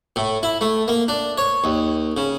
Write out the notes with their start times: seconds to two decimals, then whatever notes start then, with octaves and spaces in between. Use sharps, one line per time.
0.16 A2
0.43 E4
0.61 A3
0.88 A#3
1.08 D4
1.38 C#5
1.64 D#2
2.17 C#3